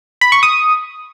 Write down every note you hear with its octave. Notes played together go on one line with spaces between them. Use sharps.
B5
C#6
D#6